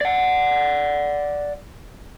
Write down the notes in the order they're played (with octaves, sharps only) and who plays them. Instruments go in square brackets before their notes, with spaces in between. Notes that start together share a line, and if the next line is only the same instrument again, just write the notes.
[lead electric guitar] D5 F#5